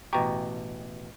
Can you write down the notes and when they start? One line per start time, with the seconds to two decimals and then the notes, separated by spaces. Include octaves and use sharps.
0.13 A1 B2 G4 G5 A#5 C#6